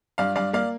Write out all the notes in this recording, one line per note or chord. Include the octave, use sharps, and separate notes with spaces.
G2 D5 F5
G2 D5 F5
A#3 D5 F5